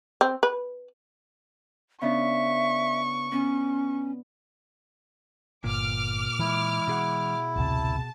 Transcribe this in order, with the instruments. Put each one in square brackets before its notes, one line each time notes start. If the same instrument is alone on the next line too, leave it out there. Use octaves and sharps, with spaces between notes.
[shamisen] C4
B4
[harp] C#3 B3 D4 [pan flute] E5 [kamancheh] C#6
[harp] B3 [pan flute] C#4
[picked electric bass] G1 [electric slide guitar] A#2 [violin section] D6 F6
[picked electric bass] E3 G#3 [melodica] E4
[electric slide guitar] B2 G#4 F#5
[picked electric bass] A1 D2 C3 [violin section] A5